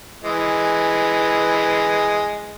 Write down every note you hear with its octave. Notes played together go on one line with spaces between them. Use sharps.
E3 G#3